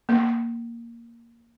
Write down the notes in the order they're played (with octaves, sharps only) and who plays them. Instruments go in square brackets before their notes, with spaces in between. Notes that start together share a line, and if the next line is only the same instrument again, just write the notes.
[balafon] A#3